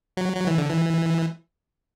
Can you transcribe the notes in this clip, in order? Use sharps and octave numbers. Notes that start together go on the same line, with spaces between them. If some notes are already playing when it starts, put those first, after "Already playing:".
F#3
F#3
E3
D3
E3